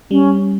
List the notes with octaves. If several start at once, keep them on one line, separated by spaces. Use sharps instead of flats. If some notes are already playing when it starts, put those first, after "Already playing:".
G3 C#4